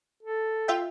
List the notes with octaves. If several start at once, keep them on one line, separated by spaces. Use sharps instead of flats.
A4
F4 E5 G5